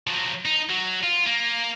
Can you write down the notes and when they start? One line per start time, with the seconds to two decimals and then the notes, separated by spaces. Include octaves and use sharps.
0.07 F3 F#3
0.45 D#4
0.70 F#3
1.04 F4
1.27 A#3